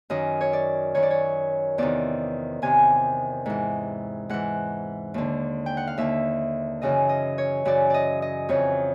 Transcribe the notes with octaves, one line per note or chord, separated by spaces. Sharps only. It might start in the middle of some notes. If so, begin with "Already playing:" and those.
F#2 D#3 D#5
C#5
D5
F#2 D#3 C#5
D5
C#5
E2 C3 D#3 D5
E2 C3 D#3 G#5
G#2 E3
G#2 E3 F#5
D#2 D3
G5
F#5
F5
D#2 D3 E5
F#2 C#3 E3 D#5
D#5
C#5
F#2 C#3 E3 D5
D5 D#5
D#5
F2 C#3 E3 C#5